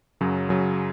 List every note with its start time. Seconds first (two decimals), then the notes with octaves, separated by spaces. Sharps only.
0.21 F#2 C#3 F#3
0.49 F#2 C#3 F#3